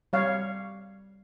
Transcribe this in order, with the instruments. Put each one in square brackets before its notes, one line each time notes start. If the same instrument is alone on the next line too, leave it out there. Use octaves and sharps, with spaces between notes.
[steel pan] G3 C#5 F5